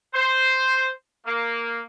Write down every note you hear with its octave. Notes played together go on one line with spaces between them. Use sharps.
C5
A#3